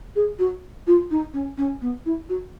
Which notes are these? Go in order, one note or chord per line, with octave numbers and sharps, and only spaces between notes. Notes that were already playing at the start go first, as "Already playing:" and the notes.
G#4
F#4
F4
D#4
C#4
C#4
B3
E4
F#4